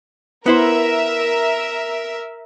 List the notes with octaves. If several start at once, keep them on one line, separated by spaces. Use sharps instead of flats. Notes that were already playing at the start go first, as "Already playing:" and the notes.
B3 E4 A#4 C5 E5